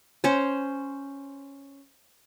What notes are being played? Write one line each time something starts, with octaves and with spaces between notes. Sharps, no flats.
C#4 C5